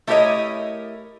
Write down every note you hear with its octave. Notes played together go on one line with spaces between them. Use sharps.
A3 E4 G4 A#4 C#5 D#5